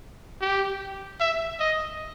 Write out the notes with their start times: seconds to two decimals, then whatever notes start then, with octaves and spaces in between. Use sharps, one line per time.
0.41 G4
1.20 E5
1.60 D#5